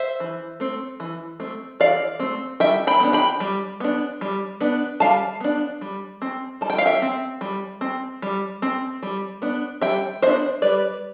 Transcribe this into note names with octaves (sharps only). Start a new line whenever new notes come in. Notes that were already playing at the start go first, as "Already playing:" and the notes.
Already playing: C5 E5
E3
A3 C4
E3
A3 C4
E3 D5 F5
A3 C4
G3 E5 G5
G5 B5
B3 D4
G5 B5
G3
B3 D4
G3
B3 D4
G3 F5 A5
B3 D4
G3
C4
G3 A5
G5
F5
E5 G5
C4
G3
C4
G3
C4
G3
B3 D4
G3 E5 G5
B3 D4 C5 E5
G3 B4 D5